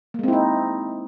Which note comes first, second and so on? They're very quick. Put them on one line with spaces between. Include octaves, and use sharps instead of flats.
A#3 G#3 C4 E4 D#4